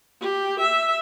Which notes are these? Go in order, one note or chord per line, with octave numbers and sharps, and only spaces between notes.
G4
E5